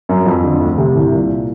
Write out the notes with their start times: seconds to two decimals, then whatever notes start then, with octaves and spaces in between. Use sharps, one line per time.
0.09 F#2
0.26 F2
0.44 D3
0.60 D2
0.78 C3
0.95 C2
1.12 A#2